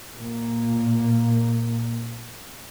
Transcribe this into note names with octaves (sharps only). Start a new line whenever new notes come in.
A#2 A#3